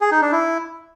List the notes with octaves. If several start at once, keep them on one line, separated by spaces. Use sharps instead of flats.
G#4
D#4
D4
E4